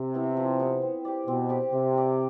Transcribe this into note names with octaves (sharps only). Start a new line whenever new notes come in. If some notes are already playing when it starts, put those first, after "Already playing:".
Already playing: C3
B3 E4
F3
B3 E4
C4
G4 D5
B2 C4
G4 D5
C3 C4
G4 D5